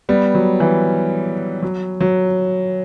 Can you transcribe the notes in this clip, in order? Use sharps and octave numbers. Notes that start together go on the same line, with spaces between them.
G3 B3
F#3
E3
F#3
F#3